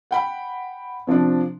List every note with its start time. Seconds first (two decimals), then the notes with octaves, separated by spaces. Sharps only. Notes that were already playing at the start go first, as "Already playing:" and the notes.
0.11 F#5 G5 B5
1.07 C3 F3 C4 D4